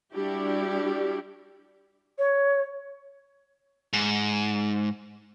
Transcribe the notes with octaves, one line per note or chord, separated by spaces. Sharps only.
G3 D4 E4 F#4 G4
C#5
G#2